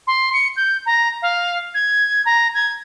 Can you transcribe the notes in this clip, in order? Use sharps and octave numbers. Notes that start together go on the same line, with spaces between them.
C6
C#7
G6
A#5
F5
G#6
A#5
G#6